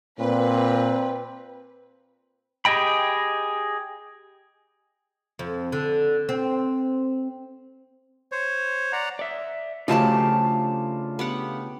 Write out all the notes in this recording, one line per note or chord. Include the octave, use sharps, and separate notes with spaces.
A#2 C4 B4
G4 G#4 D#5 G5 B5
F2
D3
C4
C5 C#5
D5 F#5 A#5
D5 E5
C#3 F3 F#3 A3 D4 F4 G4 A5
B3 G4 F#5